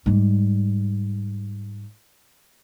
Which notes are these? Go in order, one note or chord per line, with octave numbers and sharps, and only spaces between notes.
G#2 G3